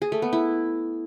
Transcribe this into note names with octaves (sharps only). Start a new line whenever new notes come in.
G#4
A3
B3
E4